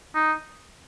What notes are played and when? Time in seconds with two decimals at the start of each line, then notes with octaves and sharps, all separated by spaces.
0.15 D#4